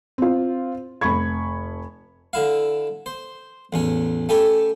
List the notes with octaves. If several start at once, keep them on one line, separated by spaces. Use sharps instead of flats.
C4 F4
F1 B5 C#6 G#6
D3 E4 F5
C5
A1 E2 C#4
A3 C#4 G4 A4 B5